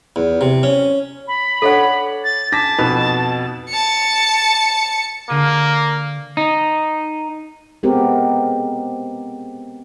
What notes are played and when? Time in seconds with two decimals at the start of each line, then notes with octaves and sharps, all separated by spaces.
0.16 E2
0.41 C3
0.63 C#4
1.28 B5
1.62 D4 A4 C#5 F#5
2.24 A6
2.52 D4 A5 D6 A#6 B6
2.79 F2 B2 D#4 B4
3.69 A5 C#7
5.30 D3 A#3 G#4 D#7
6.37 D#4
7.83 G#3 B3 C4 G4 A#4